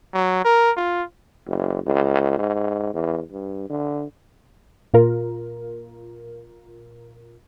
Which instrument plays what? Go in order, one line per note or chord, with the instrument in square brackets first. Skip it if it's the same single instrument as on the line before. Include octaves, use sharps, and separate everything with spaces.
[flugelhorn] F#3
A#4
F4
[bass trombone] F#1
C#2
G#2
E2
G2
D3
[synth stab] A#2 F4 A#4